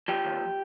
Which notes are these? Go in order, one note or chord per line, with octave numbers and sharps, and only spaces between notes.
F3 G4
D#2